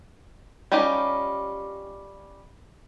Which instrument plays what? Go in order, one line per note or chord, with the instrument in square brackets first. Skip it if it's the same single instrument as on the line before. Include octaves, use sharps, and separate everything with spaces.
[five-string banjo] G3 C#4 D#4 F4 G4